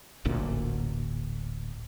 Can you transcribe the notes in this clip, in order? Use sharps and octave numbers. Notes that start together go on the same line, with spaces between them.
D1 A1 D2 A#2